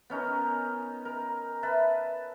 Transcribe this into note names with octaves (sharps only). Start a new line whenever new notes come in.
B3 C#4 D#4 A#4
A#4
B4 E5 A5 B5